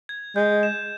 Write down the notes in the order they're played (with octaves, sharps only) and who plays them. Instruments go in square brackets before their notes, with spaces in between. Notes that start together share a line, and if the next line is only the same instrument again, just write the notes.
[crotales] G#6
[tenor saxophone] G#3 [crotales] G6
[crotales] E7